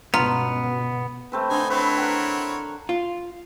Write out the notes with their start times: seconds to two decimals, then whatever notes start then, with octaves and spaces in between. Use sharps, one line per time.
0.14 G1 C#2 B2 B3 F4 A#5
1.32 A3 C4 B4
1.50 D3 D#4 C5 G#5
1.70 C4 E4 B4 C#5
1.97 A#4 F#5 G5
2.89 F4